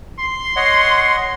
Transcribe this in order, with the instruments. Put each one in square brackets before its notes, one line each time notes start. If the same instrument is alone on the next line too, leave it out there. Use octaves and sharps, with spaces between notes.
[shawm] C6
[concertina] C#5 D#5 F#5